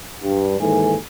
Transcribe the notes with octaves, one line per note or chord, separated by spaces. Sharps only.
G2
D#2 G#2 E3 A4 G#5